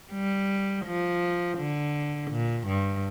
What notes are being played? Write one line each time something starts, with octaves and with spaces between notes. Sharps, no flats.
G3
F3
D3
A#2
G2